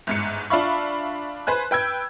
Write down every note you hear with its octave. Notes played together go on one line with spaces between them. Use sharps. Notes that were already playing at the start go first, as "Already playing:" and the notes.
G1 G#2 C#7
D4 F4 E5 F5 B5 C#6
B4 C5 G#5 F#6
B4 G5 E6 G#6